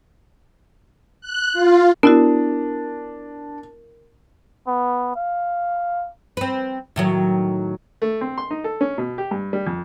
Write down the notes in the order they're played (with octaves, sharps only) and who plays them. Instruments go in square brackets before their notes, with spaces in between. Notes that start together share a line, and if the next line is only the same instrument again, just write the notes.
[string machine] F#6
F4
[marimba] B3 E4 F#4 [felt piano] D4 [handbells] A#4
[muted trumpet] B3
F5
[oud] C4 B4
A2 D#3 F#3
[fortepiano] A3
C4
C6
D#4
A4
C#4
B2
G4
G2
G3
F2